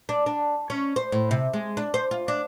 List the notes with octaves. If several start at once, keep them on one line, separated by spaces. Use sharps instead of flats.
D4
D4
C#4
C5
A2
C3
G#3
D4
C5
F4
D4